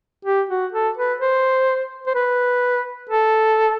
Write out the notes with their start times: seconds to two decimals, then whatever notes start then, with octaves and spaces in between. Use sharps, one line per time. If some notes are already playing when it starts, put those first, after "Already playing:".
0.25 G4
0.49 F#4
0.72 A4
0.97 B4
1.20 C5
2.07 C5
2.15 B4
3.09 A4